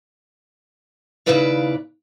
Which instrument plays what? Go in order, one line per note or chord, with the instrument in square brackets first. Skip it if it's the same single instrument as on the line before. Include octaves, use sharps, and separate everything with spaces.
[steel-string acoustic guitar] D#2 C#3 E4 B4 D5 F5